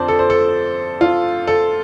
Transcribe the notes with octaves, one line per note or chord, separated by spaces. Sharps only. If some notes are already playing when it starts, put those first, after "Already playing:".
Already playing: F2 D3 C4 C5 D5 A5
A4
C5
A4
F4
A4